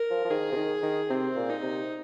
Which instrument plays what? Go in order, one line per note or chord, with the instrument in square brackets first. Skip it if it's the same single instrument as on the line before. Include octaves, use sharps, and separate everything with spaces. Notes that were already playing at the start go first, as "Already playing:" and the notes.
Already playing: [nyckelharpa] A#4
[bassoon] F3
F3
[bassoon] D#3 [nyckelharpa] G#4
[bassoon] C3
D#3
D#3
[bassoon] C3 [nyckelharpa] C4
[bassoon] A#2
[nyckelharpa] D#4
[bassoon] C3